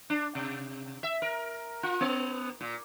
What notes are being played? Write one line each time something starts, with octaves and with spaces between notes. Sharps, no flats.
D4
C3
E5
A#4
F4
B3
A#2